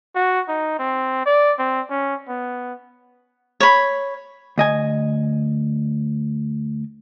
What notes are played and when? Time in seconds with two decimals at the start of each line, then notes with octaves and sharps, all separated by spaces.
0.15 F#4
0.49 D#4
0.79 C4
1.26 D5
1.59 C4
1.90 C#4
2.29 B3
3.60 C#5 B5
4.58 D2 D#5 G#5